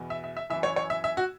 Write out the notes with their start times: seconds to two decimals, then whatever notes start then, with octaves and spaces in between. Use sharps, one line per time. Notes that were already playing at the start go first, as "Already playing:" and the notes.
Already playing: E2 B2
0.10 E5
0.24 E5
0.37 E5
0.50 E3 E5
0.53 F#2
0.63 C#5
0.76 C#5
0.90 E5
1.04 E5
1.17 F#4